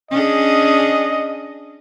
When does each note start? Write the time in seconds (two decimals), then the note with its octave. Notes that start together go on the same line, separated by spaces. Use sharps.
0.11 C#4 D4 G#4 D#5